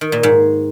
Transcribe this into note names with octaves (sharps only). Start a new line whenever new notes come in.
D#3
A#2
G#2